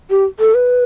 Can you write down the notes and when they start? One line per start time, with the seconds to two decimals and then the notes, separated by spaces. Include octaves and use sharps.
0.10 G4
0.40 A4
0.54 B4